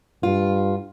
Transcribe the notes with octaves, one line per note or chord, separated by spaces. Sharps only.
G2 F4